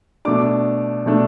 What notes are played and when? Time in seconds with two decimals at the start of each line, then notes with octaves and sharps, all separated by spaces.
0.25 B2 A3 D4 D6
1.06 B2 A3 D4